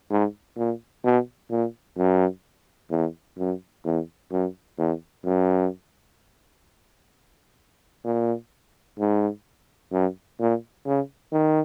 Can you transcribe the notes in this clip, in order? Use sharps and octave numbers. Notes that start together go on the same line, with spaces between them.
G#2
A#2
B2
A#2
F#2
E2
F#2
E2
F#2
E2
F#2
A#2
G#2
F#2
A#2
C#3
D#3